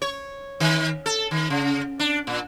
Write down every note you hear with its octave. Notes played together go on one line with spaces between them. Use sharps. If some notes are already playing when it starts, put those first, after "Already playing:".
C#5
D#3
A4
D#3
C#3
D4
A#2